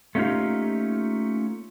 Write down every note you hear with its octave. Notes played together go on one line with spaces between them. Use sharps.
A3 A#3 C#4 D#4 F4 G4